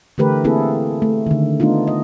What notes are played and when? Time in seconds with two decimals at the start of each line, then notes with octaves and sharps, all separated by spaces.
0.18 D3 E3 A3 G4 A#4 B4
0.44 A#3 C4 E4 G#4 A4
1.02 A3
1.27 D3 D#3
1.60 A3 B3 D4 D#4 F4
1.87 D#5